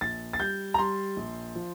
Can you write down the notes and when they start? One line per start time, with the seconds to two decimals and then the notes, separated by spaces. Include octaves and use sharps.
0.01 A#1 A6
0.33 A6
0.40 G3 G6
0.74 A#5
0.78 G3 C6
1.17 A#1
1.55 F3